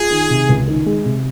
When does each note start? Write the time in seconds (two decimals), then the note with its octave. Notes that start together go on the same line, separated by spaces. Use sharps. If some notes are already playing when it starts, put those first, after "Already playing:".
Already playing: F4 G#4
0.10 D#3
0.30 C3
0.49 C#2
0.67 D#3
0.86 G#3
1.05 C3